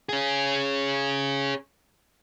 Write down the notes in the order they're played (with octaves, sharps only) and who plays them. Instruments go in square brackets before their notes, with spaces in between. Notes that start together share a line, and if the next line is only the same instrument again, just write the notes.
[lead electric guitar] C#4 G#4